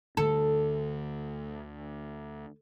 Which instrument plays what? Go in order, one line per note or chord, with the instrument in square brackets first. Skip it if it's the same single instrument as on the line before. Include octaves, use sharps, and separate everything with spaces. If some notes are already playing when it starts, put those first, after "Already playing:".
[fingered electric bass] D2 D3 A3 [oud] A4